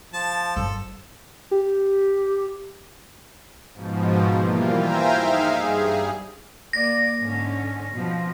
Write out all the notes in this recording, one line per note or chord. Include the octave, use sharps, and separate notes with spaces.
F3 A5
G1 F#2 A4
G4
G#2 B2 F3
E3 G3 A#3 F4
C5 E5 F5 G5 G#5 A#5
D#4 G#4 E5 F5
G2 G#4
A#3 D5 A#6
G#2 D3 C#4
B2 F3